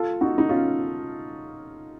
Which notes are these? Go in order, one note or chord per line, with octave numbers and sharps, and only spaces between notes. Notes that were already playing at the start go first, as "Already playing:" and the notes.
Already playing: F4 A4
D#4 F#4
D#4
C#4 F4